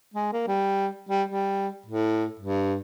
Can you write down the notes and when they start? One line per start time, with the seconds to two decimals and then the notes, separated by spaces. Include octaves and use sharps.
0.14 G#3
0.33 A#3
0.47 G3
1.09 G3
1.29 G3
1.86 A2
2.39 G2